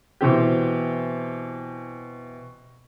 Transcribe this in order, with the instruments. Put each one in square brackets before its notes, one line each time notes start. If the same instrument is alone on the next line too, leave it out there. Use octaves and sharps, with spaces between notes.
[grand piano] B2 E3 C4 G4